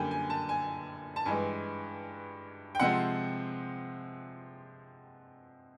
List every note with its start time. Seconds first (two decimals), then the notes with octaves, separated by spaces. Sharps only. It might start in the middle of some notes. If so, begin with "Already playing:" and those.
Already playing: F#2 D3 G3 A#3 G5 G#5
0.11 G#5
0.30 A5
0.49 G#5
1.16 A5
1.25 G2 E3 G#3 G#5
2.75 G5
2.80 C3 F3 G#3 C4 F#5